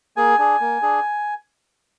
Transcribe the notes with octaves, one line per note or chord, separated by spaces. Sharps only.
A#3 G#4 G#5
D4 G#4
A#3
D4 G#4